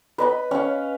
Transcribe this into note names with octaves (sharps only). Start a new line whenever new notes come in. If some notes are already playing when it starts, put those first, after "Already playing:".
B4 D#5 B5
C#4 F5